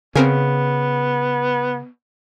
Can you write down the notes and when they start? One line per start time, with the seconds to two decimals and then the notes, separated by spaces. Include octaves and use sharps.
0.15 C#3 B3 C4 A#4 G#5